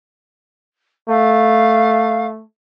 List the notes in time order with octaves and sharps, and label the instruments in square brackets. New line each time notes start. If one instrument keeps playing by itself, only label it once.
[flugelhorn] A3 [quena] F5